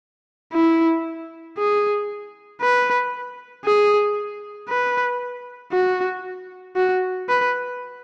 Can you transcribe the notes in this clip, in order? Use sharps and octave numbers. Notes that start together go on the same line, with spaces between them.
E4
G#4
B4
G#4
B4
F#4
F#4
B4